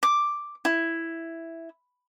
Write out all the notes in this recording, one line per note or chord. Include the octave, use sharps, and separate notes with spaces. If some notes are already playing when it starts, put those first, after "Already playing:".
D6
E4